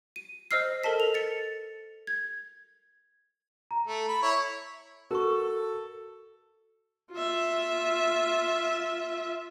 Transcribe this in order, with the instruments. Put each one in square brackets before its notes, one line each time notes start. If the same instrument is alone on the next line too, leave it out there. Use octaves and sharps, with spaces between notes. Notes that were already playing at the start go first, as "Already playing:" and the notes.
[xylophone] D#7
C5 D#5 E6 F6 C7
A4 A#4 D#5 A5 B6
F7
A6 C#7
G#6
[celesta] A#5
[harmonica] A3
B5
[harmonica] E4 C#5 [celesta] C#6
[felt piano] F#4 [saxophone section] A4 [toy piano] A#4 C#6
[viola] F4 E5